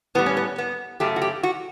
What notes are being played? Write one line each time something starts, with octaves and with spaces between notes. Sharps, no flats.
A2 G3 B3
C#4
B3
B3
F#2 C#3 F#3 A3 G4
F#4
G4
F#4